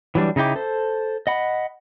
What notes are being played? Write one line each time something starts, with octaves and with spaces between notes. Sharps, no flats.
E3 F#3 G3 D4
C#3 D#4 E4 G5 D6
A4 C5
D#5 F#5 B5